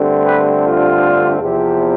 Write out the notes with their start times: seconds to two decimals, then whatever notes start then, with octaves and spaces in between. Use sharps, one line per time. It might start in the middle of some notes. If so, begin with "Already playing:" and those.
Already playing: G2 D3 A3 C4
0.24 G4 B4
0.63 D4 F4
1.40 E2 C3 F3